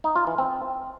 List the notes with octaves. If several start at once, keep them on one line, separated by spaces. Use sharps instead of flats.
D#4
F4
E3
C4